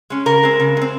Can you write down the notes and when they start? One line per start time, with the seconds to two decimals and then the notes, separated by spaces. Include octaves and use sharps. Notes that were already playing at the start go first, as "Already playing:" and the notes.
0.10 G#3 C#4
0.26 C#3 A#4
0.43 G#3 C4
0.60 C#3
0.77 G#3 C4